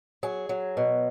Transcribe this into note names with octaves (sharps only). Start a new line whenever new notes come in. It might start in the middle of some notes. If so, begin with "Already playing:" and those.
F#3 G#4
F#3
B2